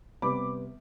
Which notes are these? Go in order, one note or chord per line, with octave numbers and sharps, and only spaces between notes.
C3 G3 B3 B5 D6